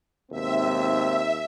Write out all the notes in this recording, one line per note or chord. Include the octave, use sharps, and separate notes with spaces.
D#2 G#2 B2 C4 E5